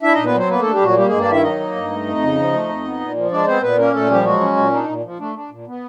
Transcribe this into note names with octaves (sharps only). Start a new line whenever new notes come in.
D4 E4 E5
A#2 D#4 D#5
B3 B4
F#3 C4 C5
A#3 B3 B4
A3 D4 A4
G3 G4
A#2 F#3 F#4
G3 A#3 G4
G2 G#3 G#4
D4 D5
D#3 E4 E5
F#3 D#4 D#5
A#3
G2
A3
F2
C#3
F3
A3
F2
B3
A#2
F3
G#3 D4 D5
B3 C4 C5
A#2 B3 B4
A#3 C#4 A#4
A#2 A3 A4
F3 G3 G4
F#3 G#3 F#4
C#4
A#2
D4 D#4
A#2
F3
A3 D4
D4
A#2
B3